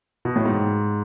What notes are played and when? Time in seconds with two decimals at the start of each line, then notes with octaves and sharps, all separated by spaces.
0.25 B2
0.36 A2
0.46 G#2